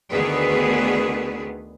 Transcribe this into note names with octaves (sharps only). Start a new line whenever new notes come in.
D2 D3 D#3 B3 G#4 B4